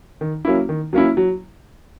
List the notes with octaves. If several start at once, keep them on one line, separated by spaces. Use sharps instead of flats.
D#3
F#3 A#3 C#4 E4
D#3
F#3 A#3 C#4 E4
F#3